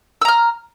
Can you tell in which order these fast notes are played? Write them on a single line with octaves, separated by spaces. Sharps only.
E6 A#5 F6